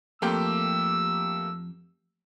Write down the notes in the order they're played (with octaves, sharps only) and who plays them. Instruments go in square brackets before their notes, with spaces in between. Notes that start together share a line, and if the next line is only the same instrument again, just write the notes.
[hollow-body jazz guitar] F2 G5 [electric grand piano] A3 A#3 G4 [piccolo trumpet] E6